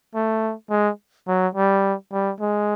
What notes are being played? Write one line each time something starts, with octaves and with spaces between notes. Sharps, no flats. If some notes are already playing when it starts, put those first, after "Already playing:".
A3
G#3
F#3
G3
G3
G#3